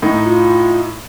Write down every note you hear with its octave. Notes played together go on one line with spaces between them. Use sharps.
A2 D#4
F4